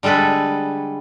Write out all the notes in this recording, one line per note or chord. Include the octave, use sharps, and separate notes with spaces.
D3 G3 G#3 A4 B4